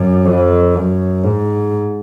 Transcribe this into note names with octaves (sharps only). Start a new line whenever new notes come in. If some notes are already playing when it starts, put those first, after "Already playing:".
Already playing: F#2
F2
F#2
G#2